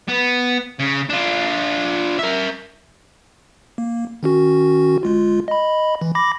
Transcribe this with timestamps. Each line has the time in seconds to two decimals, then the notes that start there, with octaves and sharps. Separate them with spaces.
0.08 B3
0.79 C#3
1.09 D4 F4
2.19 A#4 E5
3.78 A#3
4.23 D#3 C#4 F#4
5.03 G1 G#3 F4
5.48 D#5 B5
6.01 E3
6.15 B5 D6 A#6